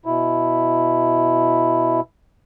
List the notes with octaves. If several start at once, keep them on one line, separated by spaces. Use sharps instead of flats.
B2 E4